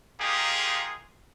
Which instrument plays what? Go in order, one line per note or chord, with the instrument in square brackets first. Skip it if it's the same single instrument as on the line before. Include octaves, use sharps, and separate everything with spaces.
[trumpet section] G#3 A#3 D#4 F4 G4 G#4